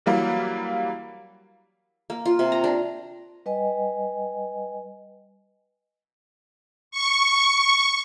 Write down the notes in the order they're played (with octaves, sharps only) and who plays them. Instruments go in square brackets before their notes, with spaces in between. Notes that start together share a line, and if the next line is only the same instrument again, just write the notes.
[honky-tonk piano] E3 F#3 G3 A#3
[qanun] A#3
F4
C3
A#5
D4
[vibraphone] G3 B4 D#5 G5 G#5
[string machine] C#6